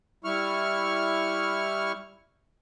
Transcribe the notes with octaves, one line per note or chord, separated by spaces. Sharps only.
G3 E4 C#6 F6